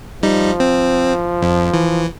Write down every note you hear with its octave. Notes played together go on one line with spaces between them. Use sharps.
F3 G3 D#4
C4
F2
E3